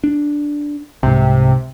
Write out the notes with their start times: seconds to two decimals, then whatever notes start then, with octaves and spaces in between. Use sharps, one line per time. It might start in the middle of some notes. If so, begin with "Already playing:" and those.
0.04 D4
1.03 C2 G#2 C3